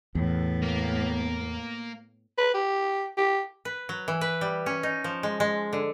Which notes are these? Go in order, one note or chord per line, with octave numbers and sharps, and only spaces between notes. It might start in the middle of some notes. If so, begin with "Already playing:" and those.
E2 A2 B3
A#3 A#4
B4
G4
G4
B4
F#3
E3
B4
G3
C#4
D#4
F3
G#3
G#3
D3